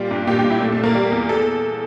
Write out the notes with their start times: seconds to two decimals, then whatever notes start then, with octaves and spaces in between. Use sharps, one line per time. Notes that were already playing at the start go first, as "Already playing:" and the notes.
Already playing: A#2 G3 F4
0.11 G2
0.27 A#2 G4
0.39 G4
0.44 A#2
0.50 E4
0.61 A#2 A3
0.72 A3
0.77 A#2
0.84 A#3
0.95 G3
1.12 E2
1.29 A4